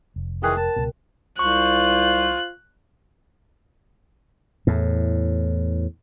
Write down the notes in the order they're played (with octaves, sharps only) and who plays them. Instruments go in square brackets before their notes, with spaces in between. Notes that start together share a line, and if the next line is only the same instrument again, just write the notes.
[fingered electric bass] F1
[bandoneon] D#3 E3 G#4 [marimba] G5 F#6
[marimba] A#4 [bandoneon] A5
[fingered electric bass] C#2 B2
[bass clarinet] C2 [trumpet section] F4 C5 [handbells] C#6 [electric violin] F#6
[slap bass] E2 A2